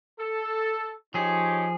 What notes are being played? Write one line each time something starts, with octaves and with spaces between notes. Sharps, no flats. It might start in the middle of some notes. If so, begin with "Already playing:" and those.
A4
F3 D#4 G4 G#4 C#5